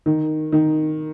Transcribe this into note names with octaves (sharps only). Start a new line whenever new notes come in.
D#3
D#3